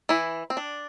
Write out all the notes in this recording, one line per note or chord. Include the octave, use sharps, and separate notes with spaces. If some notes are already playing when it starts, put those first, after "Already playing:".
E3 E4
C4
D4